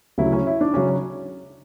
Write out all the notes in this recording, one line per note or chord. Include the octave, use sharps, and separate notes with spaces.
D2 C#3 F#3 E4
C#4
E4
D4
C#3 F#3 C#4